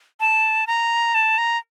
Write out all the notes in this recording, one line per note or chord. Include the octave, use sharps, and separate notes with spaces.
A5
A#5
A5
A#5